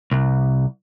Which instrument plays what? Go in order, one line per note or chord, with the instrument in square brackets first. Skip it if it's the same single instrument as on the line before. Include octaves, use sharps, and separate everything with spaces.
[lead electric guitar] C2